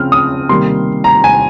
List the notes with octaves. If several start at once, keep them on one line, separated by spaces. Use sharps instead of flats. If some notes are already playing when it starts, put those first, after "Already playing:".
Already playing: C#3 F3 C4 F6
D#6
C3 D#3 G3 A#3 C6
A#5
G#5